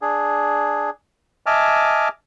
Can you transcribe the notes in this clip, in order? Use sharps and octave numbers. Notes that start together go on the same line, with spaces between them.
D4 G#4
D#5 E5 G#5 A5 D6 F6